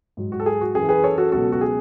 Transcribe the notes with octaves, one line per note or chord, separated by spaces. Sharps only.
G#2 F#3
F#4
A4
G#4
F#4
F#2 E3 G#4
G#4 B4
A4 C#5
F#4 A4
C#2 B2 F#3 F#4 A4
F#4
G#4